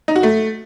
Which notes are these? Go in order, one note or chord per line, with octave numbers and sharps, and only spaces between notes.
D#4
F#4
A3